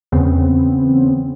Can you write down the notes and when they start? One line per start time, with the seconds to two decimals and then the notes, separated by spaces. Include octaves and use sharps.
0.12 E2 C#3 B3 C4